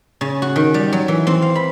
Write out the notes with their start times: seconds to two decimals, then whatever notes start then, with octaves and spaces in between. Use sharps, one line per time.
0.21 C#3
0.42 F#4
0.56 D#3
0.74 G3
0.93 F#3
1.08 E3
1.27 C4
1.42 F5
1.55 B5